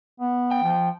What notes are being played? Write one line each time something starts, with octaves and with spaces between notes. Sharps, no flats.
B3
G5
F3